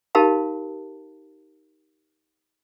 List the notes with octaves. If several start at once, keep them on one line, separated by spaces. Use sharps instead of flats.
D#4 G4 A#4 F5 A5 B5